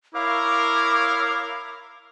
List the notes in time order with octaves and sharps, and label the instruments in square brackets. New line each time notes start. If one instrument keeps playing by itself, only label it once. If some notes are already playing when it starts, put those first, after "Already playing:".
[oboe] E4 [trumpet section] A#4 C#5 F5 [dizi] D6